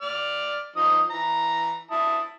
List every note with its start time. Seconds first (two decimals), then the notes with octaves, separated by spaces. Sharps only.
0.02 D5 F6
0.76 F3 D#4 D#6
1.10 E3 A#5
1.91 E4 A5 D#6